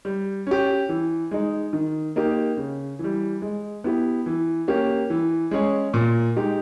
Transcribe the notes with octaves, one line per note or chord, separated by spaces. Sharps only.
G3
C#4 G4
E3
G#3 D#4
D#3
A#3 D#4 G4
C#3
E3 G3
G#3
B3 E4 G4
E3
A#3 C#4 G4
E3
G#3 C#4 G#4
A#2
G#3 D#4 G4